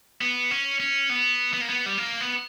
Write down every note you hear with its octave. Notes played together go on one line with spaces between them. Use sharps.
B3
C#4
C#4
B3
B3
A#3
B3
G3
A#3
B3